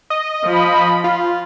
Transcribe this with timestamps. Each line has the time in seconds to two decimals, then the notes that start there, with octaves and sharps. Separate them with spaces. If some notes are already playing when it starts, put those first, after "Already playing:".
0.10 D#5
0.45 F3 B5
1.04 F4